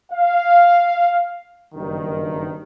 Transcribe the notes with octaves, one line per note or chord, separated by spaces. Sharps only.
F5
F#1 G2 D#3